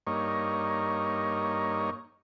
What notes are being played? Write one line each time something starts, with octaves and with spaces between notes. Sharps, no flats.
G2 A#3 D#4 C#5